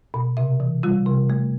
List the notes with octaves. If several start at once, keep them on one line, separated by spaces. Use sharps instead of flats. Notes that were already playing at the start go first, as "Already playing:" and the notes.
B2
C3 E5
E3
G3 F4
C3
A3